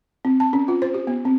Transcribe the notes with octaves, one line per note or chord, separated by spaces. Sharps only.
C4
A5
C#4
F4
C5
G4
B3
C4